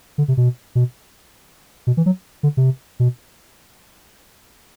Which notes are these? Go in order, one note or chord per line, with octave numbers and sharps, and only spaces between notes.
D3
C3
B2
B2
B2
E3
F#3
D3
C3
B2